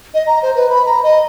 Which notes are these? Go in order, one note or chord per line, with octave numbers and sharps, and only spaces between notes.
D#5
A#5
C5
B4
B5
A#5
D#5